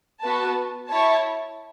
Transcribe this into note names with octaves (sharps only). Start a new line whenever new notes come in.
B3 F#4 B4 A5
E4 C#5 A5